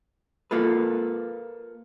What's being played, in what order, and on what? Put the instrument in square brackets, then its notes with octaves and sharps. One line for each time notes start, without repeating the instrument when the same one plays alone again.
[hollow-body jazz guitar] A#3 F4 A4 B4